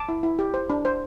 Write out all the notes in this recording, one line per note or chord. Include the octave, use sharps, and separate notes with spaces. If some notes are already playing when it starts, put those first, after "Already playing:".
Already playing: A5 D6
E4
E4
G4
C5
D4
C5